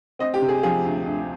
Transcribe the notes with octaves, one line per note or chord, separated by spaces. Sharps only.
C4 D#5
G4
C3
G#4
F3 G#4
D2
D2